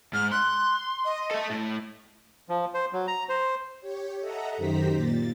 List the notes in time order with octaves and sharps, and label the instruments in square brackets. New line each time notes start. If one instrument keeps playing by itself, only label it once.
[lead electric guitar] G#2 [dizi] F6
[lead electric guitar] C6 [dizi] F#6
[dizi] D#5
[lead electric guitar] A4 E5
A2 A3
[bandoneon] F3
C5
F#3
A#5
C5
[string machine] G4 C#5
A4 D#5 E5 F#5 A#5
F#2 D#3 G4 C5 A#5 B6
A#2 A6